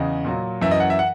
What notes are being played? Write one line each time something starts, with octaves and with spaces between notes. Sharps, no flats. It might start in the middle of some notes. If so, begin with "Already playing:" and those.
Already playing: E2 C#3 D#5
A#2 F#3
F#2 E3 E5
D#5
F#5
E5
F#5